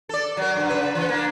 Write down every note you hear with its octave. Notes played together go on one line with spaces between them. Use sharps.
A4 D5
F#3 A#4
G2 F#3
C#3 B4
E3
A#3 D4